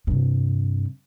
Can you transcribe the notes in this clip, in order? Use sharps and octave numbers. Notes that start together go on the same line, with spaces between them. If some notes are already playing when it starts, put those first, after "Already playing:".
G2 C3